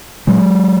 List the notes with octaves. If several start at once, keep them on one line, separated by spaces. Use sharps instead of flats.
A#2 F#3 G#3